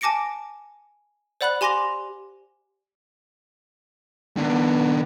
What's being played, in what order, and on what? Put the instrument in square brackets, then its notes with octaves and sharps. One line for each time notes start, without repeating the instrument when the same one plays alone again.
[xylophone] G#5 A5 D6 A#6 C#7 D7
C5 D5 F#5 B5 F#6 F#7
G4 G#5 C6 D6 A#6 F7
[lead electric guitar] D#3 D4 [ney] B3